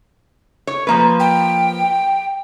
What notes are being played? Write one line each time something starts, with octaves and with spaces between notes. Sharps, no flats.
C#5
F3 A#3 B4
G5